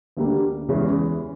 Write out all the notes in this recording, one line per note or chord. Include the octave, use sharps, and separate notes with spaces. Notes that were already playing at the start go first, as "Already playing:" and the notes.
D2 D3 G3 A#3
E2 C#3 E3 G#3